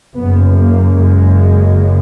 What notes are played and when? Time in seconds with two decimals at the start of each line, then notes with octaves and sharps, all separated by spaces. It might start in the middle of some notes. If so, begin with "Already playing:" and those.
0.16 F#1 F#2 C#3 B3
0.56 A#3
0.97 G#3